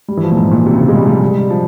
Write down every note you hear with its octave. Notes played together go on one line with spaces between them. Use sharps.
G3
E3
F3
A#2
G#2
A#2
C3
C#3
C3
G#3
G3
F3
G3
G3
G#3
G3
F3